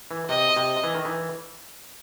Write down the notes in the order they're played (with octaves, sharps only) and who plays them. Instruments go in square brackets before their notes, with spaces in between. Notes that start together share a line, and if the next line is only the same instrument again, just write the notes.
[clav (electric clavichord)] E3
[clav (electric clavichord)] C3 [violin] D#5
[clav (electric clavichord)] C3
E3
D#3
E3